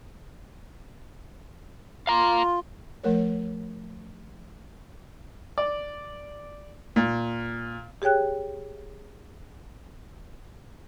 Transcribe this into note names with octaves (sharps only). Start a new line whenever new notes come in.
F4 F5 A#5
F3 A3 A#4 C#5
D5
A#2
G4 G#4 C#5 G5 F#6